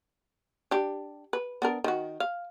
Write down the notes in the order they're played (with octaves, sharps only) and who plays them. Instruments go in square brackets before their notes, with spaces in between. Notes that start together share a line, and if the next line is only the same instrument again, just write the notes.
[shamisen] D4 G4
B4
B3 D4 A#4
D#3 F#4
F5